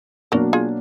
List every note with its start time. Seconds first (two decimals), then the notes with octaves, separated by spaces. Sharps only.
0.32 B2 F#3 A#3 D4 F#4 A#4
0.53 F4 G#4